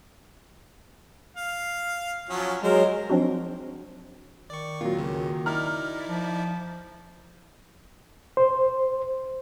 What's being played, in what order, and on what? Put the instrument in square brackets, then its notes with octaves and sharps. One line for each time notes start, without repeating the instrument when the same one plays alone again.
[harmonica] F5
F3 F#3 C#4
[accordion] F#3 G#3 [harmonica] A#4 C5
[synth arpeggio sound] F3 F#3 C4 D4 D#4 F#4
[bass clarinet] D#3 [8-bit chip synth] D5 C#6
[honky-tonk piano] A#2 F#3 [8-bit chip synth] F4
[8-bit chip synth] C#2 C#3
[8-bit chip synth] D#4 E4 D5 [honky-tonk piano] A#5 F6
[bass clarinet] F3
[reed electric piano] C5